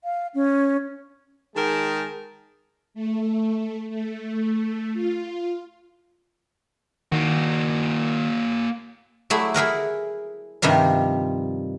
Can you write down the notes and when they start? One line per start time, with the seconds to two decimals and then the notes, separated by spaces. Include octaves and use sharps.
0.04 F5
0.34 C#4
1.56 D#3 G#3 G#4 A#4 G5 A5
2.94 A3
3.89 A3
4.94 F4
7.12 D#3 A#3 F#4
9.30 F#3 A3 E4 G#4 D5
9.54 E4 G#4 A#4 F#5
10.62 G2 C3 D#3 F3 G3